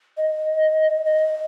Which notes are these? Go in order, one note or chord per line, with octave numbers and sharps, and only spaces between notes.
D#5
D#5